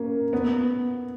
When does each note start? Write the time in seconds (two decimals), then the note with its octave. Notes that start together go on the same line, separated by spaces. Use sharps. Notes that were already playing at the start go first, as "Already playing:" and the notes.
Already playing: A#3 C#4
0.33 B3